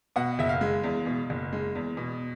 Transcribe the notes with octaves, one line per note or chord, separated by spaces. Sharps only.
B2 F#5
F#1 E5
F5
G#3
E2
B2
F#1
G#3
E2
B2